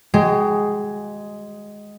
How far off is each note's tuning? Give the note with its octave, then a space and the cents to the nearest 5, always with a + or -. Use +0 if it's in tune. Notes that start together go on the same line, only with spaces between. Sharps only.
G#3 +0 F#4 +30 G5 +0